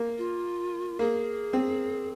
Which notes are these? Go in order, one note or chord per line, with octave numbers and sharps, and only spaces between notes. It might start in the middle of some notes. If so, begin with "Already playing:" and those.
Already playing: A#3
F4
A#3 G#4
C4